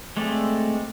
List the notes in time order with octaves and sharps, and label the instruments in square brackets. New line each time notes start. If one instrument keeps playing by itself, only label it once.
[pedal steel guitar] G#3 A3 C4 D5